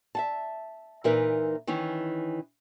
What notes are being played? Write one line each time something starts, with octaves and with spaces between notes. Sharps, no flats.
E5 F#5 A5
A#2 E3 D#4 A#4 B4 E5
D#3 E3 C#4